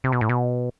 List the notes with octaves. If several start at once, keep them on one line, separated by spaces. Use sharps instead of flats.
C3
B2
A2
B2